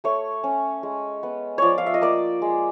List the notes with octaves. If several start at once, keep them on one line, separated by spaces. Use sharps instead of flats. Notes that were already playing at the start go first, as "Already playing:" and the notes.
A3 C#5
C#4
G#3
B3
F3 C#5 D5
F5
E5
D#5
A#3 D5
G#3